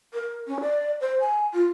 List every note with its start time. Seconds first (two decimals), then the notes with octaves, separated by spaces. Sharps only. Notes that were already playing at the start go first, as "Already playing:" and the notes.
0.14 A#4
0.47 C#4
0.61 D5
1.01 C5
1.21 G#5
1.54 F4